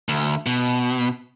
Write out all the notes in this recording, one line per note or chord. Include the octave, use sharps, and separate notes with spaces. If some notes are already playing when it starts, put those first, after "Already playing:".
D2
B2